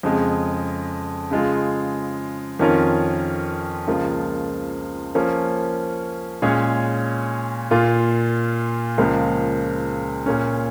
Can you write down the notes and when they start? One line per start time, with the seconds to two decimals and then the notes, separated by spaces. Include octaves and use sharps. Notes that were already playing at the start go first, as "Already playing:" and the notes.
0.03 F2 C#3 G#3
1.31 C#3 G#3 F4
2.59 F2 D#3 C#4 F4 A#4
3.87 C#2 C#3 F3 A#3 F4
5.15 F3 A#3 C#4
6.42 A#2 G#3 C#4 G#4 C#5
7.71 A#2 A#3 F4
8.98 C#2 C#3 F3 A#3
10.26 A#2 A#3 C#4